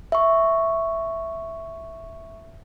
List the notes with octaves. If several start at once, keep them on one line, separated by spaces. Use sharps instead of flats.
E5 C#6